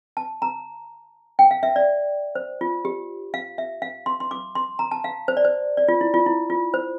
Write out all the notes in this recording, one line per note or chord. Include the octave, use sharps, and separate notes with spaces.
A5
A#5
G5
F5
E5
D5
C5
F4
G4
F5
E5
F5
C6
C6
D6
C6
A#5
A5
F5
C5
D5
C5
D5
F4
E4
F4
E4
F4
C5